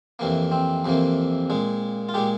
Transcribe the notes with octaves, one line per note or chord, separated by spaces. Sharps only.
F2 C3 E3 A#3
C4
F2 C3 E3 A#3
A#2 G#3
F4
A#2 G#3 G4